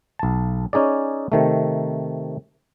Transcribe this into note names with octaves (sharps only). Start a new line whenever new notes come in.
B1 A5
C#4 D#4 G#4 D5
C3 D#3 A3